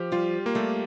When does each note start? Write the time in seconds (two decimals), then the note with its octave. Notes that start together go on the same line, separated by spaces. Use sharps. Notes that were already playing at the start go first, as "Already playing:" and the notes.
Already playing: F3 G4
0.12 G3 F4
0.46 A#3
0.55 G3 A3